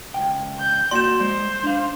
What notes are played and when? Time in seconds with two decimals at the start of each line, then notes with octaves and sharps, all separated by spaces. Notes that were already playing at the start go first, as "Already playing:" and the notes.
0.14 C#2 B2 G5
0.60 G6
0.91 A#3 F#4 D5 C6 E7
1.21 G#3 C5
1.64 D4 F5